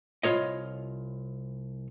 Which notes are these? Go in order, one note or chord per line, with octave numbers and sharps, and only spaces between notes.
C2 D#3 F4 C#5 D#5